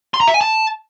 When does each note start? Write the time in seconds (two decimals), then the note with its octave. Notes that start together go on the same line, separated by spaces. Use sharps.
0.14 C6
0.21 A#5
0.27 E5
0.34 G#5
0.41 A5